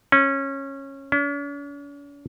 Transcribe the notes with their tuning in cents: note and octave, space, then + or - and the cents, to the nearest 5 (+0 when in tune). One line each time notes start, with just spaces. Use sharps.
C#4 -20
C#4 +45